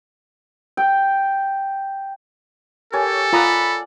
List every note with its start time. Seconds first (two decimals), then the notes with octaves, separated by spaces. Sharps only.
0.77 G5
2.93 G4 A4 A#4 C#5 G#5
3.33 F4 D5 F#5 A#5 B5 D#6